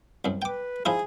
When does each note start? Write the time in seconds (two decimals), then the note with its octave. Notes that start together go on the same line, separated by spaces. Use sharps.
0.25 C2 F#2
0.42 B4 G5 D6
0.86 F3 D#4 E4 G#4